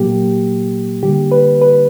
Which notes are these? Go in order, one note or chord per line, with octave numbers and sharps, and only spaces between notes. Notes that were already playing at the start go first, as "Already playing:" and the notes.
Already playing: A#2 F#3 A#3 G4
D3 G3 A#3 G4
B4
B4